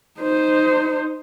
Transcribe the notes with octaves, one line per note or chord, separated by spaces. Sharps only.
D#4 C5